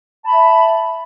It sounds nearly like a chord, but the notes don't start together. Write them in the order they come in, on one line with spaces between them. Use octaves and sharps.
A5 B5 E5